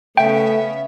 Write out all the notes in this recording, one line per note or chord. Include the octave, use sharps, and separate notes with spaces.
C#3 A3 B3 C#4 E5 G5